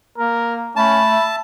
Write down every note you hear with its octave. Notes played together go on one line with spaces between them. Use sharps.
A#3 A#4
A3 C#4 A5 B5
E5